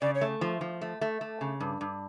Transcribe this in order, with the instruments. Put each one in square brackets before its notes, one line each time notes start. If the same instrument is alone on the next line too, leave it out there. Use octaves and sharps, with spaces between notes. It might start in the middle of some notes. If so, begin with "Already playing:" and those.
[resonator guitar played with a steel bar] C#3 [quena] D5
[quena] C#5
[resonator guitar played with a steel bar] A3
F3
F3
A3
A3
A3
C#3
G2
G2